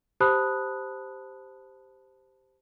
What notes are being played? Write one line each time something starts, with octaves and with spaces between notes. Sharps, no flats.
G4 C5 A5 B5 D#6 F#6